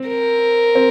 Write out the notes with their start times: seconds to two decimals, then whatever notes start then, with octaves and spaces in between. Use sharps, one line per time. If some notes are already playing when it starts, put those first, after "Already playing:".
Already playing: C4
0.08 A#4
0.75 C4